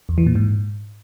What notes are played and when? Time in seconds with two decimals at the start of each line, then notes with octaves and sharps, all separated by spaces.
0.09 E2
0.18 E3
0.27 A#2
0.35 G#2